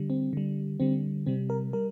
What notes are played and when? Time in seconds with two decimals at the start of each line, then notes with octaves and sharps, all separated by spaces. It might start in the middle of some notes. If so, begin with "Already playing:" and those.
Already playing: D3 G3
0.10 C4
0.33 D3 G3
0.80 D3 G3 C4
1.26 C3 G3 C4
1.50 A#4
1.73 G3 A#4